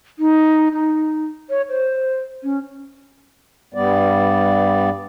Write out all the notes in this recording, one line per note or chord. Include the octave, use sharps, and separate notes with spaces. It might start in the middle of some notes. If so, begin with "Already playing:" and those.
D#4
D#4
C#5
C5
C#4
G2 G3 B3 D5